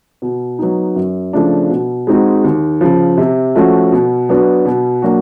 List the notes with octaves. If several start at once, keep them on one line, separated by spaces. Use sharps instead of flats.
B2
F#3 B3 D#4
F#2
C#3 F3 A3 D4
B2
G#3 C4 D#4 F#4
D#2
C#3 F3
C3
F3 A3 C#4 F#4
B2
F#3 B3 D4 F#4
B2
F#3 A#3 D4 F#4